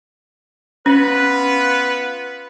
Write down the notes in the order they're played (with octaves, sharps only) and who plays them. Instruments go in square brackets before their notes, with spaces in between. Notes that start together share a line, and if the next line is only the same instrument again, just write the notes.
[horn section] B3 F4 B4 [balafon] C#4